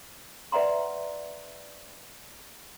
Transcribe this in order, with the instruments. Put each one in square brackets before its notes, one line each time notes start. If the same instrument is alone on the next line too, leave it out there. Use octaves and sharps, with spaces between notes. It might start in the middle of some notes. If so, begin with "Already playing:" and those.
[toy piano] B4 D5 E5 F#5 A#5 C6